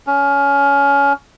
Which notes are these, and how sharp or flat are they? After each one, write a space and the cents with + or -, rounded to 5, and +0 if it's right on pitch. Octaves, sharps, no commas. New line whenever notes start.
C#4 +20